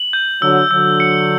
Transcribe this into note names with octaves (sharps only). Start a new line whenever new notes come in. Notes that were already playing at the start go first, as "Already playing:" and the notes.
Already playing: F#7
G6
D3 F#3 E6
D3 F#3 E6
C#7